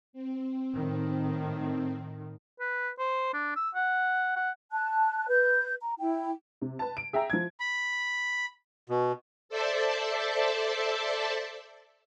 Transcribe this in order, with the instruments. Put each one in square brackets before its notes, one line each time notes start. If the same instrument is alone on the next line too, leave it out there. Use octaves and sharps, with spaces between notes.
[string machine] C4
[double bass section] A2 D#3
[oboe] B4
C5
D4
E6
F#5
F#5
[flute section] A5 F#6
B4 G6
A#5
E4 G5
[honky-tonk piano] C3
B4 A5
D7
G#4 E5 G5 A#5
F3 G#6
[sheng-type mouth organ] B5
[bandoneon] B2
[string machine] A4 C5 D5 E5 A5